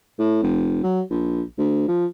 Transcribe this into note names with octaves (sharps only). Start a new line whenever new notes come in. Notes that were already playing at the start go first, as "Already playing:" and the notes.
A2
F1
F#3
A#1
D2
F3